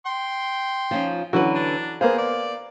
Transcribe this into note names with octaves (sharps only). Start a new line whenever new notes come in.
G5 C6
F3 C#4 D#4
D3 E3 F#3 C#4 F#4 B4
D4
A#3 B3 G#4 C5 F5
D5